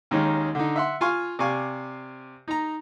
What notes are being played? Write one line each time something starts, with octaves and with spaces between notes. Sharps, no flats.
D#2 D#3 G#3 C#4 D#4
D3 D#4
E5 F#5 C6
F4 F5 G#5 C6 C#6
C3 D5 F5 G#5 C#6
D#4 A#5